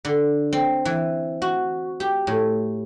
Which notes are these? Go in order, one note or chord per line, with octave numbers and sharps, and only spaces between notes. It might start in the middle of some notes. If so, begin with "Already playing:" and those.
D3
C4
E3
F#4
G4
A2